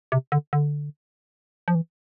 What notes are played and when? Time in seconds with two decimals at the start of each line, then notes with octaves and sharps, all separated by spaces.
0.12 C3
0.32 D3
0.53 D3
1.68 F3
1.75 E3